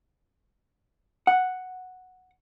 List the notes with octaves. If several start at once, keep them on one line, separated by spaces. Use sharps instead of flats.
F#5